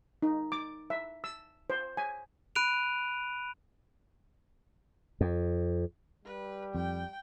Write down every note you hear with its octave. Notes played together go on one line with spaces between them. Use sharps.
D#4
D6
E5
E6
C5
G#5
B5 F#6 D7 D#7 F7
F2
G3 B4
F2 G5